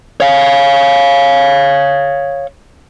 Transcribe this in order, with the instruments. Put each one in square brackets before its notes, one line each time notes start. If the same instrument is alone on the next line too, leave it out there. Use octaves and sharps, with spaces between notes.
[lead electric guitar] C#5 F5